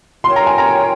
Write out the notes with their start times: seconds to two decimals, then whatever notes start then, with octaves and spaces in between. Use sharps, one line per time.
0.24 F4 A#4 C#5 G5 C6
0.36 A#5
0.47 G#5
0.58 A#5